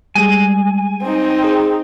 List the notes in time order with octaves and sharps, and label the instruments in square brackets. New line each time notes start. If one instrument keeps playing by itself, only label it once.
[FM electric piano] G3 G#3 [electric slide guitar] G#5
[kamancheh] C4 D#4
[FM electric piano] G#4